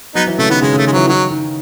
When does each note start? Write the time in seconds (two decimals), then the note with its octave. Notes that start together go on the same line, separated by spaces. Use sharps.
0.15 F#3 B3 D#4
0.27 E3
0.38 C#3 A3
0.50 D#3 B3
0.62 C#3 G#3
0.73 C#3 A3
0.85 D#3 G#3
0.92 E3 F#3
1.08 D#3 F#3
1.31 D#3